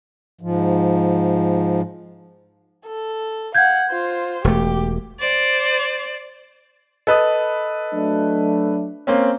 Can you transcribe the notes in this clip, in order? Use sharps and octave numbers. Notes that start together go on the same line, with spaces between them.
G#2 F3
A4
F5 F#5 G6 G#6
F4 C5
E1 A3 G4
C5 D5
A4 B4 D#5 D#6
F#3 A3 D4
A#3 C4 C#4